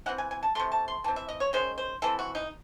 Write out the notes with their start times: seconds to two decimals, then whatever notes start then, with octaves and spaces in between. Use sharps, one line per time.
0.06 E3 C4 F#5
0.18 G#5
0.31 G#5
0.43 A5
0.55 C3 E3 A3 C6
0.72 A5
0.88 C6
1.04 E3 C4 A5
1.16 E5
1.29 D#5
1.40 C#5
1.53 D#3 G#3 C#4 C5
1.78 C5
2.02 E3 C4 A4
2.19 F#4
2.35 D#4